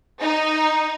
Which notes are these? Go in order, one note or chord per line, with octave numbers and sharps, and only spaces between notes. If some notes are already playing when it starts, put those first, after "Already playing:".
D#4